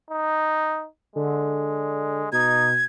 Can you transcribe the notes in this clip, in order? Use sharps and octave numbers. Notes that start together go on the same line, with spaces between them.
D#4
D3 G#3
B2 D#4 G#6